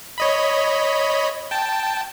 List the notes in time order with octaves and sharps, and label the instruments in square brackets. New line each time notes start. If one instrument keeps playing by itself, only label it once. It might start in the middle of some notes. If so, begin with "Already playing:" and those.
[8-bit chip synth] C#5 D#5 B5
G5 A5